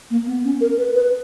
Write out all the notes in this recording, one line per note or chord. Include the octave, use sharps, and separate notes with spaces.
A#3
B3
C#4
A#4
B4
B4